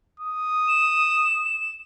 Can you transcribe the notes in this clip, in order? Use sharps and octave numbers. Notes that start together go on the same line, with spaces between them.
D#6
E7